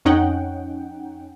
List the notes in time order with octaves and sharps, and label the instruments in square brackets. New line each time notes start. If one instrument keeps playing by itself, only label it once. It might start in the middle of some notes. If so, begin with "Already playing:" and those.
[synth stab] F2 C#4 D#4 F#5 G5